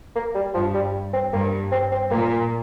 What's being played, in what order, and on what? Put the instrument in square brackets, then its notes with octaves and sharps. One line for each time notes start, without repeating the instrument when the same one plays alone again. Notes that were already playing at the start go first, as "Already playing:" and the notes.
[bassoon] A#3
G3
[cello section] G2 [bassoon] F3
[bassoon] G3
C4
[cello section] G2 [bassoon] A#3
[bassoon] C4
C4
[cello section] A#2 [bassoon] A#3